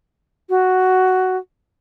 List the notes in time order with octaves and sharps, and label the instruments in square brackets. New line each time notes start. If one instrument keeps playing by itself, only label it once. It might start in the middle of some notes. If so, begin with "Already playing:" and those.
[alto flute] F#4